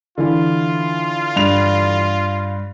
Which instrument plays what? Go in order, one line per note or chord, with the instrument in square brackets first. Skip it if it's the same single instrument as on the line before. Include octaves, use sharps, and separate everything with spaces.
[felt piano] D3 E3 E4 [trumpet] F4
[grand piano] G2 F7